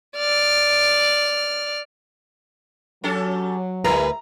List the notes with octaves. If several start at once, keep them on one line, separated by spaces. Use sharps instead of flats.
D5 F6
F#3 C#4 G4 A4
D2 G3 E4 A#4 B4 A#5